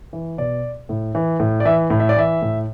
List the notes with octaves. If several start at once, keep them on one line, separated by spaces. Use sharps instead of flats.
E3
B2 D5
A2
E3
A2
D5
E3 E5
A2
E5
D5
E3 E5
A2